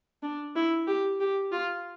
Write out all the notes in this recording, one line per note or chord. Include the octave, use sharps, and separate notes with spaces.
D4
E4
G4
G4
F4